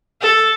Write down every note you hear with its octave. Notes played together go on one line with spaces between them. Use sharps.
A4